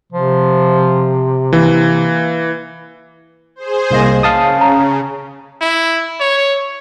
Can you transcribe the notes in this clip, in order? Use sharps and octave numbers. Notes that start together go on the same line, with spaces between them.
C3 F3
E3 A#3
G#4 C5
C2 A#3 D#5
C#3 F5 A5 D#6
A#5
E4
C#5